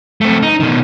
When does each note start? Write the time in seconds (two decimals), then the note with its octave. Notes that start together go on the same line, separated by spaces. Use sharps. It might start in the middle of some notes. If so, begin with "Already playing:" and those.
0.21 A3 C4
0.42 D#4
0.60 B2 D#3